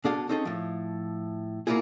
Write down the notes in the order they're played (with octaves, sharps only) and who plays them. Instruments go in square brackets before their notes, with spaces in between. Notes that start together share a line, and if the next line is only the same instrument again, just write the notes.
[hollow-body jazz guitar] B2 D4 G#4 A4 F5
C4 C#4 D#4 G#4 A4
A2 F3
B2 A#3 C4 E4 F4 G#4